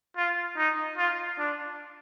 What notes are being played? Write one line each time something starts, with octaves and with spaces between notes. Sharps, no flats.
F4
D#4
F4
D4